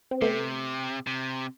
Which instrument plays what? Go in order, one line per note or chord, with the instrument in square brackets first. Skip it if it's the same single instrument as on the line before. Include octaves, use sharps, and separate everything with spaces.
[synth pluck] C4
[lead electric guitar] C3 [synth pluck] A3 B3
[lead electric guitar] C3